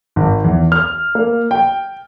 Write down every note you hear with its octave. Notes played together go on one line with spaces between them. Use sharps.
G#1
E2
F6
A#3
G5